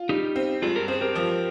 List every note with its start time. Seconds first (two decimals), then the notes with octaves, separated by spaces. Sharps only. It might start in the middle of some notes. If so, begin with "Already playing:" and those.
Already playing: F4
0.09 G3 D#4 G4
0.36 C4
0.62 G2 F4 G#4
0.75 G4 A#4
0.88 C4 G#4 C5
1.01 G4 A#4
1.15 F3